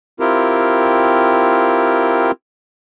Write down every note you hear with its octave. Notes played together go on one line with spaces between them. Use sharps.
C4 E4 F4 G4 A#4